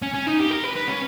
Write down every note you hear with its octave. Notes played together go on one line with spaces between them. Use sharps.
C#4
C#4
D#4
G4
A#4
B4
B4
C#4